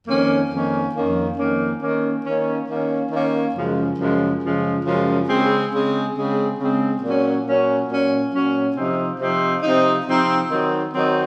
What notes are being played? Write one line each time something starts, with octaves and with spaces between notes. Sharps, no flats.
F2 D#3 A#3 C#4
F2 D#3 A#3 C#4
F2 D#3 A#3 C#4
F2 D#3 A#3 C#4
D#3 A#3 C#4
D#3 A#3 C#4
D#3 A#3 C#4
D#3 A#3 C#4
F#2 C#3 F3 G#3
F#2 C#3 F3 G#3
F#2 C#3 F3 G#3
F#2 C#3 F3 G#3
C#3 G#3 C4
C#3 G#3 C4
C#3 G#3 C4
C#3 G#3 C4
A#2 F#3 C#4
A#2 F#3 C#4
A#2 F#3 C#4
A#2 F#3 C#4
C3 F3 C4 D#4
C3 F3 C4 D#4
C3 F3 C4 D#4
C3 F3 C4 D#4
D#3 F#3 C4 D#4
D#3 F#3 C4 D#4